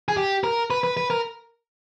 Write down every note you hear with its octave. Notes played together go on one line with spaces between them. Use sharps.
G#4
G4
A#4
B4
B4
B4
A#4